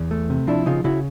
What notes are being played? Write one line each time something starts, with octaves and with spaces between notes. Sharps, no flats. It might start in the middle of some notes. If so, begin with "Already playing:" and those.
Already playing: E2
A3
C3
F3 D4 E4
C#3 D#4 F4
C#3 E4 F#4